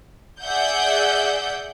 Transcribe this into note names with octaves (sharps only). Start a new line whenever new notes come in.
G#4 D5 E5 F#5 G6